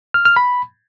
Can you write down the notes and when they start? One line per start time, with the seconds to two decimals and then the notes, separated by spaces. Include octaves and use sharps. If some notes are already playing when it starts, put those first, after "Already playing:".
0.14 F6
0.25 F6
0.36 B5